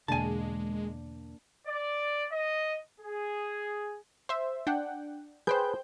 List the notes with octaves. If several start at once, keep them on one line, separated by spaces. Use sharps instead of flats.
E2 B2 D3 G#3 A#3 D4 G#5 A5
D5
D#5
G#4
C5 E5
D4 F#5 G5
G#4 B4 C5 G5 G6